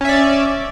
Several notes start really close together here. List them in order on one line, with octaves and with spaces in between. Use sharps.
C#4 E5 D5